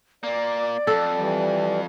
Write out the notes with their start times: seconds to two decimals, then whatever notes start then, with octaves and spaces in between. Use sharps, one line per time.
0.23 A#2 A#3 D5
0.87 F2 A4
1.18 E3 G3